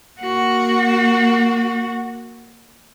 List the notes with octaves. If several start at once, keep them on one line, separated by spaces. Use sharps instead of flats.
A#3 F#4